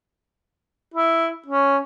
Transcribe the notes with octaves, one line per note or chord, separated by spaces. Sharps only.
E4
C#4